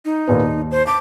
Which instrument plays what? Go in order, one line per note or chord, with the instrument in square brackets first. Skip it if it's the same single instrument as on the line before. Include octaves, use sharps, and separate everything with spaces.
[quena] D#4
[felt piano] D#2 A#2 B3
D#2
[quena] C5
[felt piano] A5 [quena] D6